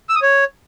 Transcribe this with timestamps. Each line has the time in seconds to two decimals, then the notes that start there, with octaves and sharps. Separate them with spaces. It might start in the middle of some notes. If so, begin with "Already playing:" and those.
0.09 E6
0.16 D#6
0.22 C#5